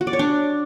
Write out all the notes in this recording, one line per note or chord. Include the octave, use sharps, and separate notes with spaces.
F#4
D5
C#5
D4